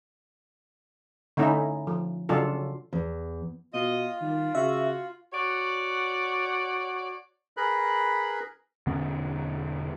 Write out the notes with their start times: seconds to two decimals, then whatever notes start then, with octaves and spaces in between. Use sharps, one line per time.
1.37 D3 A3 C#4 D#4 E4
1.87 F3
2.29 C#3 F#3 D4 F4 A4
2.93 E2
3.74 B2 F4 D#5
4.21 D#3 G3
4.55 C#3 F#4 E5
5.33 F#4 C#5 D5 F#5
7.57 G#4 A#4 B4 B5 F#6
8.87 E1 D3 B3 C#4